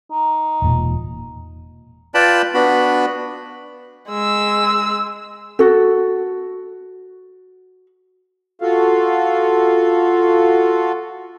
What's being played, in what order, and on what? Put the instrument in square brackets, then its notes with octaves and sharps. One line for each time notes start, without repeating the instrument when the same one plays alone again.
[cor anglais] D#4
[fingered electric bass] E1 A#2
[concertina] F4 B4 D5 G5 A5 B5
B3 D4 F#4 B5
[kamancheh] G#3 E6
[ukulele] F#4 A4
[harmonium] F4 F#4 A4 F5